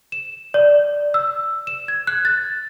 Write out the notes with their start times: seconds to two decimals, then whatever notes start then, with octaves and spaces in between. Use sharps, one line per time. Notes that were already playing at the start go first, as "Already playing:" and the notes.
0.12 E7
0.54 D5
1.14 E6
1.67 E7
1.88 G#6
2.07 F#6
2.25 A6